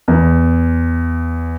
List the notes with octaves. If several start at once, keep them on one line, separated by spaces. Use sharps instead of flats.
E2